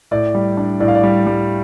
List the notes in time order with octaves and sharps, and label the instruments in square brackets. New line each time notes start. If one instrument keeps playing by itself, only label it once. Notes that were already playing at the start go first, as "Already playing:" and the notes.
[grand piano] A2 D5
G3
D4
A2 D5
F5
D5
G3
G3